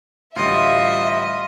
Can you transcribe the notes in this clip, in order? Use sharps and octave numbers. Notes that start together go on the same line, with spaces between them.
A1 D2 G3 F4 D#5 E5